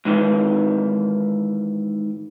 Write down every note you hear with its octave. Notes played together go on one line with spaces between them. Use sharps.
G#2 D#3 E3